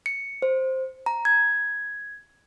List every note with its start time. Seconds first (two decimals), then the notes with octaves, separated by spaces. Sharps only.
0.06 C#7
0.42 C5
1.06 A#5
1.25 G#6